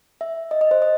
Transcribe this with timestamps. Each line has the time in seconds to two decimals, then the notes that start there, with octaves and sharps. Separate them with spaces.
0.21 E5
0.51 D#5
0.61 D#5
0.71 C5
0.82 D#5